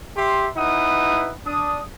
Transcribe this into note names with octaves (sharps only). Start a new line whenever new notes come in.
G4 E5 C6
D#4 E4 B4 F#5 D#6
D4 D#6